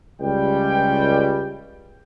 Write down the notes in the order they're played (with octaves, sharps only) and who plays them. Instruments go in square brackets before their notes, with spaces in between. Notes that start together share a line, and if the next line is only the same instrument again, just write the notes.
[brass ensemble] C#2 G3 G5